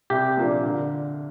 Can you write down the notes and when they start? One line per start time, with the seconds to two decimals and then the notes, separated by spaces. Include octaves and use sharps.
0.10 C2 G4
0.37 A#2 F3 A#3 D4
0.63 D3